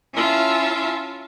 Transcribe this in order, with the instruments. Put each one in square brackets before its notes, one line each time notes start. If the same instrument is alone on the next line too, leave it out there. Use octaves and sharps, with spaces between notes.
[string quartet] C#4 E4 F4 E5 A5